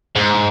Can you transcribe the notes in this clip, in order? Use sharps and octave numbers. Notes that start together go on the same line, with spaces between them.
G#2